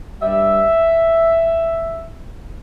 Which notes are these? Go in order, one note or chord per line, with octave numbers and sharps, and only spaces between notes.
G2 G3 E5